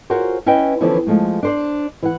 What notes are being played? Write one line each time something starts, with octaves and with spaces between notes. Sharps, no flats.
F4 F#4 G#4 A#4 C5 C#5
C#4 E4 B4 D#5 G5
D3 E3 F3 B3 C#4 E4
F3 G#3 A3
D4 C5 D5
E3 F#5